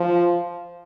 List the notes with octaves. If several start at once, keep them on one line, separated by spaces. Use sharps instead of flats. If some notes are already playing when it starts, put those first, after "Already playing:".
Already playing: F3